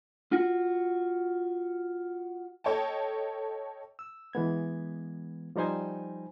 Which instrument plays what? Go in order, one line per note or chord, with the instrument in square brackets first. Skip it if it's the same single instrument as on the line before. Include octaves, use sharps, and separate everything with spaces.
[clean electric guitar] F4 F#4
[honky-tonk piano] A4 C#5 D#5 G5 A5
[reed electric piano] E6
E3 G#3 B3 G#6
F3 G3 D#4 C5 G#5